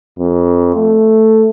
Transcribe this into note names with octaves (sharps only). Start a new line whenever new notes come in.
F2
A3